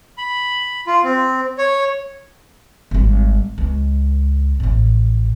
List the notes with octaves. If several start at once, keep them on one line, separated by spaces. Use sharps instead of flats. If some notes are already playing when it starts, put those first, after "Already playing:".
B5
F4
C4
C#5
G#1 G3
C#2
A1 A2